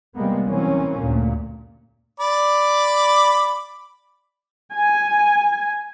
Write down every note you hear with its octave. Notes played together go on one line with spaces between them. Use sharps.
C3 G3 G#3 A#3 B3
B2 E3 F#3 A#3 C4 C#4
D2 G2 A#2
D5 B5 D6
G#5